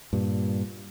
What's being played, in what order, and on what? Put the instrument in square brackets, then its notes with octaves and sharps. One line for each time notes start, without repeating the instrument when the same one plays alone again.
[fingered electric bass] G2 A#2